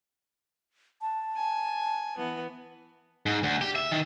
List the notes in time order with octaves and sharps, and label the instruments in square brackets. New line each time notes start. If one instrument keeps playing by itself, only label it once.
[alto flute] A5
[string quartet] G#5
E3 B3
[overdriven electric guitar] G#2
D2
G4
E5
D#3